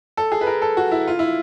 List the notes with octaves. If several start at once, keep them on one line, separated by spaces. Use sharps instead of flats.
A4
G#4
B4
A#4
A4
F#4
E4
F4
E4